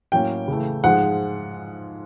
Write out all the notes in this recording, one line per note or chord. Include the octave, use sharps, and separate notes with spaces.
A2 F#3 A#3 C#4 G5
C#3 E3 A3
G#2 F3 G#3 F#5